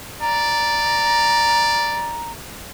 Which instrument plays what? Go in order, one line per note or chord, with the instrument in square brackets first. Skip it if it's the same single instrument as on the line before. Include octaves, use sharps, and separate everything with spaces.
[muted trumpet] D5 [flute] A#5